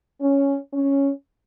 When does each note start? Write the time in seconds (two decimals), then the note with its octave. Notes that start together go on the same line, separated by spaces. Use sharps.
0.21 C#4
0.74 C#4